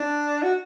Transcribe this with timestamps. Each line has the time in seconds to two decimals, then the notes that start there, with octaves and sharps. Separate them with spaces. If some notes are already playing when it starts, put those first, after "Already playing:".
Already playing: D4
0.43 F#4